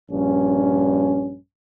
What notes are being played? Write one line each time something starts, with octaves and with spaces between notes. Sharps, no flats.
A#1 G2 C#4